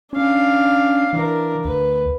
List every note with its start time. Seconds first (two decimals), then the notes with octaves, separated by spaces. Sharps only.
0.13 C#4 D4 F5
1.13 E3 D4 A#4
1.65 D2 B4